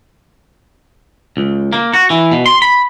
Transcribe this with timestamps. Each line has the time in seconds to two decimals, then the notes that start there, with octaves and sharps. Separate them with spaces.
1.37 C#2
1.73 A#3
1.94 F#4
2.10 E3
2.32 B2
2.46 C6
2.62 B5